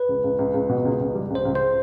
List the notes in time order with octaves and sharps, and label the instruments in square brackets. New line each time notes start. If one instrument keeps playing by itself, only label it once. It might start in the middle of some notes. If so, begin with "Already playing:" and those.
Already playing: [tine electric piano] B4
[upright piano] C#2
C#2
C#2
C#2
B2
C#2
C#2
G3
C#2
[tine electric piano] C5
[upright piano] C#2
[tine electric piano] C5